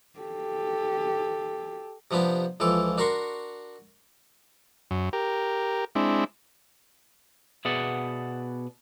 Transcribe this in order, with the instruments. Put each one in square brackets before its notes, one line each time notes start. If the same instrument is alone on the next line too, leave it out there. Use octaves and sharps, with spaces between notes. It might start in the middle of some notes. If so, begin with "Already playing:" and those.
[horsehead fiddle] G4 A4
[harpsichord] C3 F3 B3 D4 G4
C#2 E3 F3 A4 D6
D4 F#4 A#4 A#5 C6 C#6
[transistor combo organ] F#2
G4 A#4
G#3 C4 D4 E4
[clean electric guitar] B2 B3 G#4 D5 E5 F#5